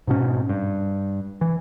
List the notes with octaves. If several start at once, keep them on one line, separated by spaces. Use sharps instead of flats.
G#2 B2 C#4
G2
E3